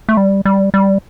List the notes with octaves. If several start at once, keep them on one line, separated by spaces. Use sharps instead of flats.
A3
G3
G3
G3